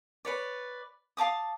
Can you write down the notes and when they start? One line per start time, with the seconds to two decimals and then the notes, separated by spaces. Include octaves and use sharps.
0.25 B4 C#5 D5
1.17 F5 A5 D6 D#6